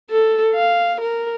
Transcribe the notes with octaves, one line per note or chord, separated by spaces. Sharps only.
A4
F5
A#4